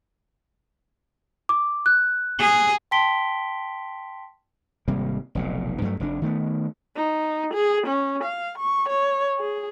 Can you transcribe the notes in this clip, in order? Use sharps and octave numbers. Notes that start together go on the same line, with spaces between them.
D6
F#6
G#4
G5 A5 C6 B6 D7 G7
G#1 C3 G3 A#3
F1 B1 A#2
G2 F#3 A3
F1 C3 D4
D#3 A3 B3
D#4
G#4
C#4
F5
C#6
C#5
G#4